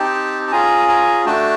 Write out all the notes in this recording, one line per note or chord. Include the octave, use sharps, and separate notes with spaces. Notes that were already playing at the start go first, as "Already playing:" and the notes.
Already playing: C4 D#4 G4 G5 A5
A5
C#4 F4 G#4 G#5 A#5
G#5 A#5
A3 D4 F#4 G5 A5